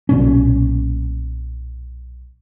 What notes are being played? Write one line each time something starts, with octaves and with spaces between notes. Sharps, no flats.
B1 A#2 C#4